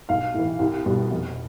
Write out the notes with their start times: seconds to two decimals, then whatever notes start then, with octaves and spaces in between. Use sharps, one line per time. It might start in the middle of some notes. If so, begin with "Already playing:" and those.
0.09 B1 F5
0.34 A2 E3
0.59 C2
0.86 B2 G3
1.11 F1